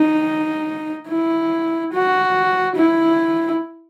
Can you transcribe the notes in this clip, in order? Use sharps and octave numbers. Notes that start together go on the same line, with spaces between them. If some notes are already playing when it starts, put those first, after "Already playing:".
Already playing: D#4
E4
F#4
E4